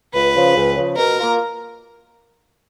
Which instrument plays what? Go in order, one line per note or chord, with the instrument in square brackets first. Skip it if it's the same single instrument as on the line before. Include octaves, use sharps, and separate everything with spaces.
[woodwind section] C#2 [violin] B4
[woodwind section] C#3 F3
C#2
C#3 F3
[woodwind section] B2 [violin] A#4
[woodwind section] A#3 F4